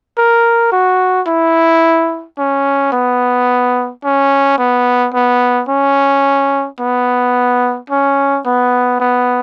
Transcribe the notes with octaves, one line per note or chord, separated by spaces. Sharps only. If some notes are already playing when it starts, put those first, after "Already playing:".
A#4
F#4
E4
C#4
B3
C#4
B3
B3
C#4
B3
C#4
B3
B3